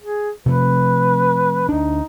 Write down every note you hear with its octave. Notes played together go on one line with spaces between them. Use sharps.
G#4
C3 F3 A3 B4
D2 D4 D#4